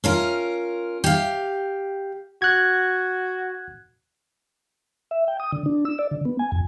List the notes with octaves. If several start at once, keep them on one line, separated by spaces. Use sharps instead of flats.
C#4 F4 A#4
G4 F5
F#4 F#6 G#6
E5
G5
D#6
D3
D4
E6
D5
D3
B3
G#5
F2